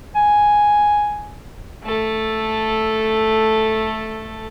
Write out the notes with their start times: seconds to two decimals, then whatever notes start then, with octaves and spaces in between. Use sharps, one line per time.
0.15 G#5
1.84 A3 A4